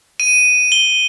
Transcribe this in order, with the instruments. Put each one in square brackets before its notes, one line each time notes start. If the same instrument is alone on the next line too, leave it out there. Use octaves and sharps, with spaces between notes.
[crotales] D#7
G7